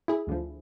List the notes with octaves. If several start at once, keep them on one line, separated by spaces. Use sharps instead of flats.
E4 G#4
D2 D3 F3